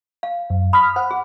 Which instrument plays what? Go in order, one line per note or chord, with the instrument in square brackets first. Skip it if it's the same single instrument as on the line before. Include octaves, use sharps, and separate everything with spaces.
[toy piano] F5
[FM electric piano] F#2
[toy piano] B5 [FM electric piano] D#6 F6 B6
[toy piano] C5 [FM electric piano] F#5
[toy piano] G#4